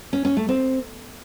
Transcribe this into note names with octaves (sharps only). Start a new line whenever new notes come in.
C#4
C#4
A3
C4